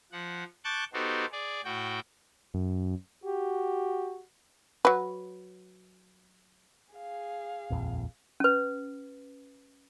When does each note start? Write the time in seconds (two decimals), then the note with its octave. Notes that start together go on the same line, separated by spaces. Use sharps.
0.12 F3 F#5
0.64 A5 C#6 D6 F#6 G6 A6
0.93 B3 D#4 F#4 G4 A4 C5
1.32 G#4 D5
1.65 A2 F#4 G5
2.54 F#2
3.24 F#4 G4
4.85 F#3 B4
6.94 G#4 F5
7.70 D#1 A#1 F2
8.40 C#4 B4